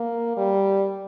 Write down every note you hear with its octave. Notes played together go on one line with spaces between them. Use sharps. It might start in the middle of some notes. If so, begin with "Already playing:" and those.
Already playing: A#3
G3